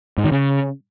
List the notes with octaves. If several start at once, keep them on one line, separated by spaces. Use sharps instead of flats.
G#2
D#3
C#3